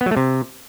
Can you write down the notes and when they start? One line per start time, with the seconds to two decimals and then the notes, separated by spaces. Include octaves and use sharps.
0.01 B3
0.06 F#3
0.11 A3
0.17 C3